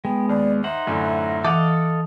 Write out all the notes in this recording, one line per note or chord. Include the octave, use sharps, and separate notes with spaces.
G#3 B3 G5
D#2 D5
D#4 C5 E5 F#5
F#2 A2 D3
E3 A4 D#5 F5 F#5 D6